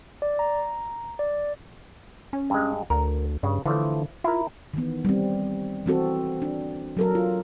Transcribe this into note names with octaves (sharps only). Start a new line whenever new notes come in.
D5
A#5
D5
C#4
G2 G#3
D2 A#4
G2 C#3
D3 E3 F3 A3
E4 F4 A#4
D#3 E3 B3
G3 C4
E3 C4 F#4 A4
D4
F#3 A4 A#4
F4